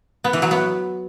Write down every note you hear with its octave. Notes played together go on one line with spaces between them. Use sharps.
B3
E3
F#3
B3